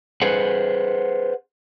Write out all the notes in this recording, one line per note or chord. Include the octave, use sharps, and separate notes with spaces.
G#4 B4 C5 F#5